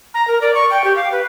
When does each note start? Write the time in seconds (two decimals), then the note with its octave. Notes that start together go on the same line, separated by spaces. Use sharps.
0.14 A#5
0.28 A#4
0.41 D5
0.55 C#6
0.71 G5
0.84 G4
0.96 F5
1.12 B4